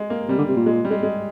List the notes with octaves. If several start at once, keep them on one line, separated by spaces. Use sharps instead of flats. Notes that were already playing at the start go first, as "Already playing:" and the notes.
Already playing: G#3
A#3
C3 G3
D3
C3
A#2
G#3
G3
G#3
G#3